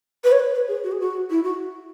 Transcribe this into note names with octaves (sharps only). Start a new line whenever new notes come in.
B4
C#5
B4
B4
G#4
F#4
G#4
F#4
E4
F#4